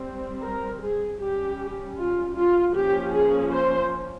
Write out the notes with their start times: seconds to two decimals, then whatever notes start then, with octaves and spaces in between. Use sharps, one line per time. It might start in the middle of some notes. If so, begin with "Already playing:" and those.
Already playing: G3 C4
0.42 A#4
0.81 G#4
1.18 G3 C#4 G4
1.97 F4
2.35 F4
2.74 F3 A#3 C#4 G4
3.13 G#4
3.51 C5